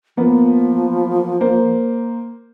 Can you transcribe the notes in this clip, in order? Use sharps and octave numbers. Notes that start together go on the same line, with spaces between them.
F3 A#3 B3
A#3 C5